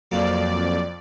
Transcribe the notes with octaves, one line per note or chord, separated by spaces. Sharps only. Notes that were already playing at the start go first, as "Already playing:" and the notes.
F2 F#3 A#3 D5